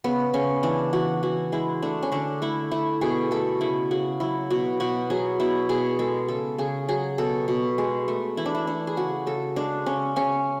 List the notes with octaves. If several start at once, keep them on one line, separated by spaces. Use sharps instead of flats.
C#3 B3
C#3 C#4
E3 D4
E3 F#4
E3 F#4
G#3 E4
A3 D4
C#4
D3 D4
A3 E4
A3 E4
B2 G#4
A3 A4
C#3 E4
C#3 F#4
F#3 E4
B2 F#4
B2 F#4
F#3 G#4
B2 E4
B2 G#4
G#3 A4
C#3 A4
C#3 G#4
F#3 G#4
B2 A4
B2
G#3
A3
E3 E4
D4
E4
A3 D4
G#4
C#3 F#4
C#3 A4
G#3 D4
C#3 C#4
C#3 C#4